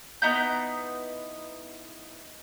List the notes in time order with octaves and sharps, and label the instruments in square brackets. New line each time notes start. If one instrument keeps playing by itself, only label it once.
[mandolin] B3 D#4 E4 G6